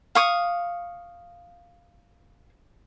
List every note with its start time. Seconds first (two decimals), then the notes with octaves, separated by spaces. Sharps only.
0.15 F5 C#6 D#6